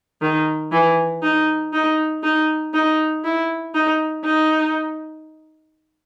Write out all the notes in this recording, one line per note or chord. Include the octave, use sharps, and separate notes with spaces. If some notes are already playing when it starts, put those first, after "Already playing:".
D#3
E3
D#4
D#4
D#4
D#4
E4
D#4
D#4